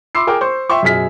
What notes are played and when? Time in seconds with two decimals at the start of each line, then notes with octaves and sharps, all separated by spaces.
0.15 B5 C6 D6 E6 C7
0.27 G#4 A#4 G5 D6
0.41 C5 C#6
0.70 E5 G5 C6 C#6
0.83 F#2 B2 G#4 F6 B6